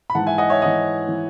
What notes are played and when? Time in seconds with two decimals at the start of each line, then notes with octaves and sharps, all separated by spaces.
0.10 B5
0.15 G#2 E3 F#5 A5
0.26 E5 G#5
0.38 D#5 F#5
0.50 C#5 E5
0.62 G#2 E3 D#5 F#5
1.08 E3